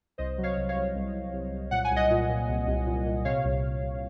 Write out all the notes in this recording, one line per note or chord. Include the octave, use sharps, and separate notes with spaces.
C2 C5 D#5
F#3
C#5 F5
C2
C#5 F5
C2
C2
C2
C2
C2
A#2 F#5
G#5
C2 D#5 F#5
A#2
A#2
C2
C2
A#2
A#2
C3 C#5 F5
C2
C2
C2